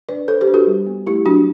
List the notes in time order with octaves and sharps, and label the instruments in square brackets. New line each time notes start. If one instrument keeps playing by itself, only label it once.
[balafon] D4 B4 D5
D4 A4 C5
G4 B4
D4
F#4 A4
G3
B3
A3 E4 G4
F#3 D4 F#4